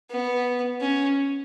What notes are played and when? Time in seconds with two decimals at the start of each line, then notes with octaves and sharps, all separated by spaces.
0.11 B3
0.81 C#4